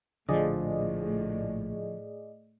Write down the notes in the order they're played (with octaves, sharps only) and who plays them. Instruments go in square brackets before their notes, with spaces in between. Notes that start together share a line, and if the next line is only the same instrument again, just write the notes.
[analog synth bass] A#1 [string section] A2 [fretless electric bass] D3 F3 [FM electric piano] G#4 D5 D#5